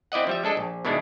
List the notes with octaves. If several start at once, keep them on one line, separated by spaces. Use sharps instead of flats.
C4 E4 D5 D#5 F#5
F3 G3 E5
G#3 D4 A4 D#5
A#1
B2 D#3 E3 G#3 D4 E4